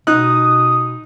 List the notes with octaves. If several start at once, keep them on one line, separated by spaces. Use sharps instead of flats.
B2 D#4 D#6 F#6